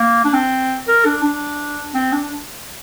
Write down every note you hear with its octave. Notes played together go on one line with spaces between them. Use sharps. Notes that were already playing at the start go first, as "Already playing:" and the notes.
Already playing: A#3
D4
C4
A#4
D4
D4
C4
D4